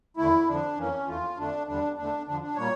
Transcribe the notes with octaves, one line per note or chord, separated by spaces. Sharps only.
E2 D3 A3 E4
F2 D3 F3 D4
F2 E3 A#3 C#4
E2 E3 A3 F4
F2 D3 A3 D4
E2 D3 G3 D4
E2 D3 A3 D4
F2 D3 F3 D4
D4
A#2 G3 A#3 C#5